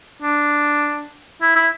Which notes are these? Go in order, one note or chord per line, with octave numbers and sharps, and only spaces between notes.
D4
E4
E4